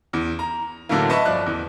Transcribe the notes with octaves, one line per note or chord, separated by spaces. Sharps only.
E2
A#5
A2 D3 E3 F#3 A3 A#3
B4 D#5 E5 A5 C#6
G1 F3 D5 F#6
E2